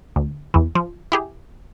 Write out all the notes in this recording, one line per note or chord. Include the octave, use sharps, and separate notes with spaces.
D2
E2 E3
F3
E4 G4 G#4